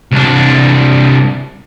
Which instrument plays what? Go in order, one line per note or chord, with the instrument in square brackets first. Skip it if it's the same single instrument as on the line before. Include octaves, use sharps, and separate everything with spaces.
[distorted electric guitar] C2 D4